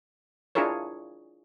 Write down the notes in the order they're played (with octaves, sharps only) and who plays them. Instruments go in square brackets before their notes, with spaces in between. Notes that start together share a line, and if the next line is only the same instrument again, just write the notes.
[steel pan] D4 E4 F4 G#4 A#4 C#5